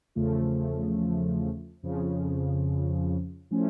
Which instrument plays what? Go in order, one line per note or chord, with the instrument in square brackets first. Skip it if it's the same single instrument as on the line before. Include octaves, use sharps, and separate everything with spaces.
[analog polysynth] E2 C#3 F3 A3
F2 C#3 F3
A2 F3 A3 C#4